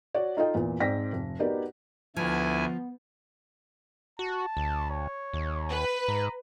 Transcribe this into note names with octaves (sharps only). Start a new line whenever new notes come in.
F#4 C#5 D5
D#4 F4 A4 D#5 G5
E2 A#2
G#2 C4 D5 G5 A#6 B6
F1
B3 D#4 F#4 G4 A#4 D5
D2 F3 B3 E4 G#5
F#4 A5
D2
C#5
D#2
B4
G#2 A#5